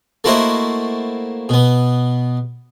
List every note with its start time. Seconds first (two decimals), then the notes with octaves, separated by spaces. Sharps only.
0.24 A3 A#3 E4 F#4 C5 D#5
1.49 B2 B3